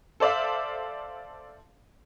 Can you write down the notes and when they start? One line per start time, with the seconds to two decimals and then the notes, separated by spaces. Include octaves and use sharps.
0.20 A4 C5 D5 E5 F5